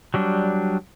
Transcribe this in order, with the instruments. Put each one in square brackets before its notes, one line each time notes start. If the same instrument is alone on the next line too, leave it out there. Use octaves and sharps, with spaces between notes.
[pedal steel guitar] F#3 G3 D4